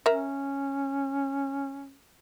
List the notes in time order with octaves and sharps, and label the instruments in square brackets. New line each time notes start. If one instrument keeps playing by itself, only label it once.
[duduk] C#4 [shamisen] A#4 E5